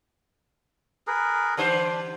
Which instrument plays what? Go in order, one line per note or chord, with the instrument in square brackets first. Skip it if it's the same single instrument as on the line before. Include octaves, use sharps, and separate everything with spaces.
[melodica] G#4 A#4 B4
[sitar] D3 G3 C5 [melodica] D4